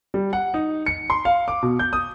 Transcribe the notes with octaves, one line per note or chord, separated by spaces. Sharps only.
G3
F#5
D#4
C#7
C6
F5
D6
B2
G6
D#6